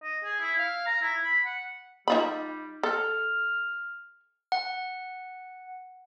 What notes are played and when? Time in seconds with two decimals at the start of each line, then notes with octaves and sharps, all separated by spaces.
0.03 D#5
0.24 G#4
0.40 E4
0.58 F5
0.86 A#5
1.01 E4
1.24 B5
1.45 F#5
2.08 G3 D#4 F4 B5
2.83 A4 F6
4.52 F#5